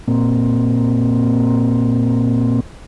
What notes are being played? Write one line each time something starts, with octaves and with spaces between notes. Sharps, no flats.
A#2 A#3 C4